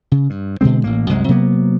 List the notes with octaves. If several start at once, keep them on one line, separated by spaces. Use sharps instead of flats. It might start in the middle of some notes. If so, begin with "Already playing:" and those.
C#3
G2
B2 D3 G#3 C4
A1 A2 A#3
C2 F#2 G#3
C3 F#3 A#3 B3